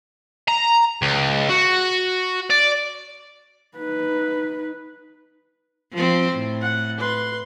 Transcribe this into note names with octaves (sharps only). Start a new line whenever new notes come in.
A#5
C#2
F#4
D5
D#4 B4
F3 C4
A2
F#5
B4 C6